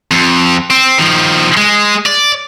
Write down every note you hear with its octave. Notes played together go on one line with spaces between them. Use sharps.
F2
C4
D#3 F3
G#3
D5